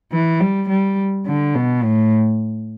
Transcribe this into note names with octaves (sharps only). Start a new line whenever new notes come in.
E3
G3
G3
D3
B2
A2